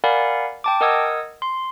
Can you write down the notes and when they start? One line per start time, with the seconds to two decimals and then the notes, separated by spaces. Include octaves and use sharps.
0.04 A#4 D5 F5 F#5 G#5 B5
0.64 G5 A5 D6
0.81 A#4 D#5 F#5 D#6 E6 G#6
1.42 C6